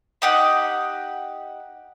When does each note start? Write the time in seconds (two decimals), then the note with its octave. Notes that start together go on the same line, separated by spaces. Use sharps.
0.22 D#4 G4 F#5